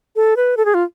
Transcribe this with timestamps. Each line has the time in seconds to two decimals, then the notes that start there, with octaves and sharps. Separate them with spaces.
0.16 A4
0.37 B4
0.57 A4
0.65 G#4
0.74 F4